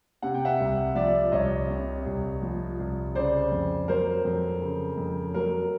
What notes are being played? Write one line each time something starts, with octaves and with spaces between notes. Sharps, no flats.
C3 F#5
G5
E5 F#5
C2
F3 D5 E5
C2 C#5 D#5
C3
C2
F3
C2
C#3 C5 D5
F2
F#3 A#4 C5
F2
C#3
F2
F#3 A#4